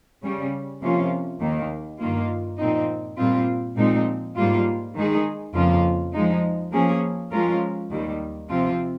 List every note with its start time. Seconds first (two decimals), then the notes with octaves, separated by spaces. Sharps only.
0.23 C#3 G3 C#4
0.82 C3 F3 A#3 C#4 F4
1.40 D#2 D#3 A#3
2.00 G2 D#3 A#3 F4
2.58 A#2 F3 C4 D#4
3.18 A#2 G3 C4 F4
3.77 A#2 F3 G#3 C4 D#4
4.36 G#2 G3 A#3 F4
4.95 D#3 G#3 D#4 G#4
5.54 F2 C#3 F3 A#3 F4
6.13 F3 G#3 D#4
6.72 F3 A#3 C#4 G#4
7.31 F3 G#3 C#4 F4 A#4
7.91 D#2 D#3 G3
8.49 C3 F3 C4 F4